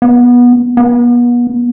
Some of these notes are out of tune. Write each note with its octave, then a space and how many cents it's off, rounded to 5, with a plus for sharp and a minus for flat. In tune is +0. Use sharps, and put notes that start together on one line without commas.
B3 -20
B3 -35